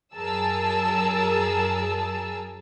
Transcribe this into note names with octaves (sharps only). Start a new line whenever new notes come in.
F#2 F#3 G#4 A#4 A5 E6